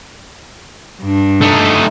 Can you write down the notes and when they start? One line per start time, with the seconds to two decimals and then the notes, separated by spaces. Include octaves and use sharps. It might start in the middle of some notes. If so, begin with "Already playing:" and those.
1.02 G2 D4
1.41 A3 D#4